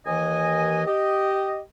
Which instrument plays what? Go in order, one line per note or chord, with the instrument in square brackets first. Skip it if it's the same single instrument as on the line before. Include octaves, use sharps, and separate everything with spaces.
[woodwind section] D#2 E3 D#5 G#5
G4 D#5